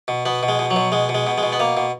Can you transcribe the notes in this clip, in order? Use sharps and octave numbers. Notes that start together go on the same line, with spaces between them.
B2
B2 B3
B2
G#3
B2
F#3
B2
B2 G#3
B2
G#3
B2
G#3
B2
B3
B2 A#3
B2